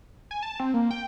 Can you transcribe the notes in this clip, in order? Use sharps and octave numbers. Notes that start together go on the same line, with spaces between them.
G#5
A5
C4
A#3
G5